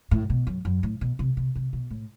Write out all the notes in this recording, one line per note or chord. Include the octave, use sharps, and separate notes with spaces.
A2
B2
F#2
F#2
A2
B2
C3
C3
C3
B2
A2